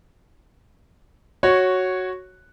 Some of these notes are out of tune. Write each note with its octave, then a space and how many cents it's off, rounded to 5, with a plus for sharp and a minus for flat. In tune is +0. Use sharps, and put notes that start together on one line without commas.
F#4 +0 C#5 -5